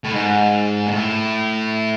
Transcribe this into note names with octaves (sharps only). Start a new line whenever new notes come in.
A2
G#2
A#2
A2